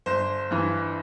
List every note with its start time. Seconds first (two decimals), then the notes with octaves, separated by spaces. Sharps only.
0.06 G1 C5
0.51 G2 E3